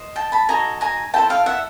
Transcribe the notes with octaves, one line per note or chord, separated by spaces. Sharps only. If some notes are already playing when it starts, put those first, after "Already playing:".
Already playing: C5 D#5
G5 A5
A5 B5
D#4 F#4 A4 G#5 A#5
G#5 A#5
E4 A4 C5 G5 A5
F5 G5
E5 F#5